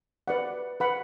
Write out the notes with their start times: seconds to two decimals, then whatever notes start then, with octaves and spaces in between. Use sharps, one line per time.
0.28 B4 D5 F#5
0.80 B4 F#5 B5